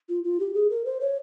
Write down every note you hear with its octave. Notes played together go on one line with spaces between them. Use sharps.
F4
F4
G4
G#4
A#4
C5
C#5